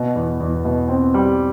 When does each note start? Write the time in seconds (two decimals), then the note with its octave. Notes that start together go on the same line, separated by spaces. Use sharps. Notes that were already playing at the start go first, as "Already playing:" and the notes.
Already playing: B2
0.16 E2
0.40 E2
0.65 B2
0.89 C4
1.14 G3